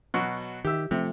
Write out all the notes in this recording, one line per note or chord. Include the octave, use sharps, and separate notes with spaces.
B2 F#3
D#3 G4 E5
C3 F3 A3